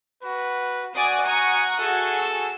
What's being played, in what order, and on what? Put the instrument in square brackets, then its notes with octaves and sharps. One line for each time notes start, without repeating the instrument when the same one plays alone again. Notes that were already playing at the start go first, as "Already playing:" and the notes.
[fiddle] F#4 [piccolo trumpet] B4
[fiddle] F#4 [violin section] D5 G#5 D#6 [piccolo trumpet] F#5
[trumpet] G#5 [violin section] A#5 C#6 D#6
[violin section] F#4 G#4 [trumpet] A4 [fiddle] E5
[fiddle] E6